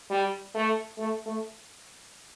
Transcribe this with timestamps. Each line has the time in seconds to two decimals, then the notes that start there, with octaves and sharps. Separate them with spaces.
0.10 G3
0.55 A3
0.98 A3
1.26 A3